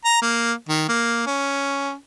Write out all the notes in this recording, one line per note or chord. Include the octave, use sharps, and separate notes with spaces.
A#5
A#3
D#3
A#3
C#4